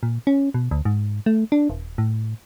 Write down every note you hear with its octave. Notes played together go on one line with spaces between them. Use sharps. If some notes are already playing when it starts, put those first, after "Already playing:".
A#2
C#4
B2
D2
G#2
A3
D4
D#1
A2